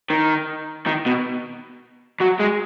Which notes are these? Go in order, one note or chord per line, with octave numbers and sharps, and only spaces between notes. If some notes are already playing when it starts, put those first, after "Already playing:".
D#3
D#3
B2
F#3
G#3